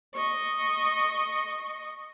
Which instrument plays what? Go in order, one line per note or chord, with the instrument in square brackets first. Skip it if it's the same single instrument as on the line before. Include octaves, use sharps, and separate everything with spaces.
[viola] D#5 C#6